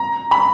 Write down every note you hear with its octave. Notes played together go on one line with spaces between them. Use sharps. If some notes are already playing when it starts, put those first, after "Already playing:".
Already playing: A#5
B5